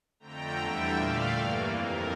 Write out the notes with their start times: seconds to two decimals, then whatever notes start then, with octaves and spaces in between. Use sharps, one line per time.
0.20 F2 D3 A3 G5 A#5
0.57 E2 D3 G3 E5 G5
0.94 A#2 A3 D5 F5
1.32 G2 E3 A#3
1.69 F2 C3 F3 A#4